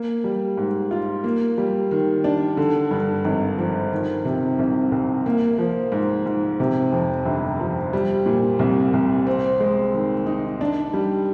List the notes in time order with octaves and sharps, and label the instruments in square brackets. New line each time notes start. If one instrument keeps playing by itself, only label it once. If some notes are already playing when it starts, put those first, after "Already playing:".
Already playing: [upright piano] A#3
G3
G#2
F4
A#3
G3
D#3
D4
D3
G2
G#1
F3
D#3
C3
C2
C2
A#3
F3
G#2
G#2
C3
F2
G1
F3
G3
A#2
C2
C2
C4
G#3
D#3
D#4
D4
G3